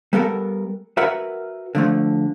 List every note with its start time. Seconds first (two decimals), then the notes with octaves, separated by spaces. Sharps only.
0.13 G3 B3 A4 A#4
0.97 F#4 A#4 B4 E5 F#5
1.75 D3 F3 A3